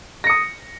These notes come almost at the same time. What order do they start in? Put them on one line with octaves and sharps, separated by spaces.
A#6 C#7 D#6